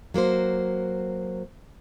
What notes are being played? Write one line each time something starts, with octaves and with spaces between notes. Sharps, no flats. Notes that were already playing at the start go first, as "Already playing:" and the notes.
F#3 A#3 F#4 C5